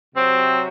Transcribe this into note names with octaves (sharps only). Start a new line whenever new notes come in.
C3 F#3 C4